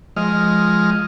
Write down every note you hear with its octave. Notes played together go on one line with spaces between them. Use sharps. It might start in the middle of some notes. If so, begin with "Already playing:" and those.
F3 G#3 D#5 F6